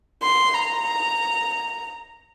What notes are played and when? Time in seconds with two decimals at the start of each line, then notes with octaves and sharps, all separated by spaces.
0.23 C6
0.54 A#5